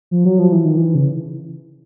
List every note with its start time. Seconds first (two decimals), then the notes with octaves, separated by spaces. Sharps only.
0.11 F3
0.25 F#3
0.39 F3
0.52 E3
0.65 D#3
0.77 E3
0.95 C#3